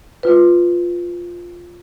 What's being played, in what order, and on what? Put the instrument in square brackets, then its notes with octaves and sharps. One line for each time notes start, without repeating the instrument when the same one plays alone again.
[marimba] F4 B4